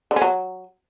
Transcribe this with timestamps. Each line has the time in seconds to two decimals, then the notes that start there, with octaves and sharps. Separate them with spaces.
0.11 D3
0.16 C#4
0.22 F#3